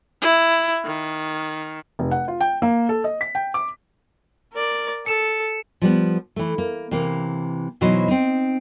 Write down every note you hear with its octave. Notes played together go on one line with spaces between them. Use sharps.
E4
D#3
F1
F#5
F4
G5
A#3
A4
D#5
B6
G5
D6
A#4 D5
A4 C#7 E7
F3 G3 B3
E3 A3
A#3
C3 E3 A#3
B2 E3 F#3 D#4 C5 D#5
C4 D#4